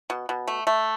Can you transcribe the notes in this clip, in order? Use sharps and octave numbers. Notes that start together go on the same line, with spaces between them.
B2
B2
A3
A3